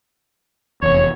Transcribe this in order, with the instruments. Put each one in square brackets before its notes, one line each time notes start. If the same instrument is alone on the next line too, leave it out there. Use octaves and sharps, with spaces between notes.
[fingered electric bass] F1 E2 [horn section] C#5